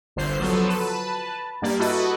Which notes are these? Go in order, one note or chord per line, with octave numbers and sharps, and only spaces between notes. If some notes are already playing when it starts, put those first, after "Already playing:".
G1 C2 D3 C5 C7
F3 F#3 B3 A4
B4 A5
G2 G3 A#3 D5
E4 F#4 A4 B4 D#5